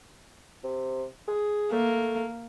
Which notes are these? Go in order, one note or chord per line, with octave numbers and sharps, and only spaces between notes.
C3
G#4
A3 A#3